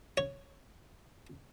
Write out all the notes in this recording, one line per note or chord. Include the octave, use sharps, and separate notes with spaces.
C#5